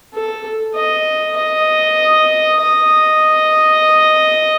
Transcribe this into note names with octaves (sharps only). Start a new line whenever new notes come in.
A4
D#5
D#5
D#5